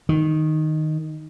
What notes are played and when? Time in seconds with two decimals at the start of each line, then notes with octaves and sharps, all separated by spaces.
0.09 D#3